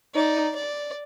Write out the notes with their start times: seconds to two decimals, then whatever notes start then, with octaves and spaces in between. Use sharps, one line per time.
0.14 D#4 D5
0.56 D5